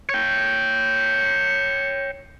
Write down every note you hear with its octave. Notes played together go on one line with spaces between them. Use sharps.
C#5 G5